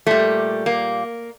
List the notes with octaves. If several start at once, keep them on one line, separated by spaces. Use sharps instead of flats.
A#2 G3 A3
A#3